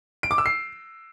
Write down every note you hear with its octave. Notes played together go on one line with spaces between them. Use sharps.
D7
D6
E6
C7